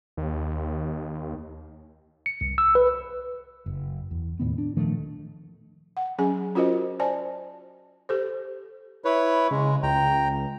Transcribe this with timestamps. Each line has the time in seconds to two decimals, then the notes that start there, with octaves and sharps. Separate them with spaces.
0.17 D#2
2.26 C#7
2.41 C2
2.58 E6
2.75 B4
3.66 F#1
4.11 E2
4.40 D#2 A2 D#3 B3
4.58 D4
4.77 A#2 D#3 F3 A3
5.97 F#5
6.18 F#3 C#4 G#4 G#5
6.55 C#4 F4 F#4 A#4 C5 D#5
7.00 C5 D5 G#5 A5
8.09 G4 A4 C5
9.05 E4 B4 C#5
9.51 C#3 G#3
9.83 C#2 G5 A#5